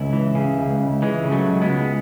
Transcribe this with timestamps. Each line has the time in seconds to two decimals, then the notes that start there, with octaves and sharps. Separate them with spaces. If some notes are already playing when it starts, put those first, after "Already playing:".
Already playing: C#2 C#4 E4
0.13 E3
0.35 C#3
0.58 C#2
0.80 C#2
1.02 E3 G#3
1.24 C#3
1.32 F#3 A3
1.46 C#2
1.61 G#3 B3
1.69 C#2